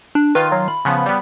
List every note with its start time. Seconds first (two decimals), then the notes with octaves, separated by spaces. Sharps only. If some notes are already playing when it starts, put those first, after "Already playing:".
0.15 D4
0.35 D#3 F4 B4 C7
0.52 F#3
0.68 B5
0.85 C#3 F3 B3
1.06 G3 B3